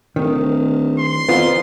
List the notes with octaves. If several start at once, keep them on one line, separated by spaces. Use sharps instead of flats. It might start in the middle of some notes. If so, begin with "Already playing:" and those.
D1 D#3
C6
F2 B3 F4